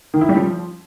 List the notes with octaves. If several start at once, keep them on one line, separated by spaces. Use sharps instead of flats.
D#3
E4
G3
F3